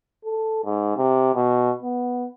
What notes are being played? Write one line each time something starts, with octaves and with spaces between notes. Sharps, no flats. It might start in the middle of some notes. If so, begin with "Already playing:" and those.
A4
G#2
C3
B2
B3